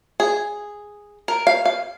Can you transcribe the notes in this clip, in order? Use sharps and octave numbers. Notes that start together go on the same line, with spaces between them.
G#4
A#4
F5
F5